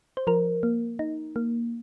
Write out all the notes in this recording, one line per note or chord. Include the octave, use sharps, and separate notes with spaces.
C5
F3 A#4
A#3
D#4
A#3